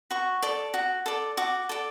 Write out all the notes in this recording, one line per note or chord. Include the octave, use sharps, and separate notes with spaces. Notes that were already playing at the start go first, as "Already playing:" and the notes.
F#4 C#6
A4 D5
F#4
A4 D5
F#4 D6
A4 D5